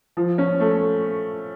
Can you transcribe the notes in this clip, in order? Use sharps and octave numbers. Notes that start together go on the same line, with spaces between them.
F3
C#4
A3